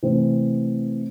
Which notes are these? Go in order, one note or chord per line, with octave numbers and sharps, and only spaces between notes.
C3 E3 A3 C4